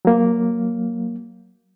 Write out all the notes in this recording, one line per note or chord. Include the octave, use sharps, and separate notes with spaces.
F#3 A#3